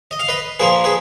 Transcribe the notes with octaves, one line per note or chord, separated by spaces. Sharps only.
D#5
F5
B4 D#5
A#2 F3 A#3 G#4 B4
G#4 B4